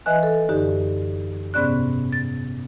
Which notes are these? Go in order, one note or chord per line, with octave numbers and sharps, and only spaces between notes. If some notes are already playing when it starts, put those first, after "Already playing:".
E3 B4 D#5 E5 G#5 F#6
A4
F#2 D3 D#4 G4
G#2 C3 B3 C#4 D5 F#6
A6